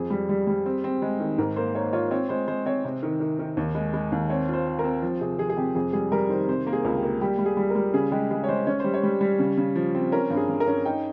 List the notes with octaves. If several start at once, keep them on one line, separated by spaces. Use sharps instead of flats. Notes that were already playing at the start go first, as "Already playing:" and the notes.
Already playing: F2 G#4
G3
G3
G3
C4
C4
G#3
D#3
G#2 A#4
A#3 C5
A#3 C#5
F4 C#5
C4 C#5
G#3 C5
G#3 C5
C4 C#5
C3
D#3
D#3
D#3
D#2
G#3
G#3
D#2
C4 C#5
F4 C5
C4
A#4
C4
F3
C3 G#4
F3 G#4
G#4
C3 G4
F2 G#4
G3 G#4
G3 A#4
D#3 C5
C3 C5
A#3 A#4
G#4
C#2
G4
A#3
G3 G4
G3
G#4
G3
A#4
G3
C#3 G#4
G#3 G4
G#3 G#4
C#5
G#3 C5
C#4 C#5
G3 C5
C#5
G3
G3
C#3
C#3
F3
C4
C#4 A#4
G2
G#4
G2
A#4
C#4
D#4 G5